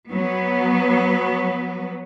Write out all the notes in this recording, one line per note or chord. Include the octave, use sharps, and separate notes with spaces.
F#3 B3